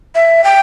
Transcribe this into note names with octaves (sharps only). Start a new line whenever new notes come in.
E5
G5